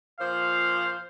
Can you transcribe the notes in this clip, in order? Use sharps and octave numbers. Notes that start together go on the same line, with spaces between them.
A#2 F3 C5 F5